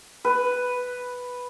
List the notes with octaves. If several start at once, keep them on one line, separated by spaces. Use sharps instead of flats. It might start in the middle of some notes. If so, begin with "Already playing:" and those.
B4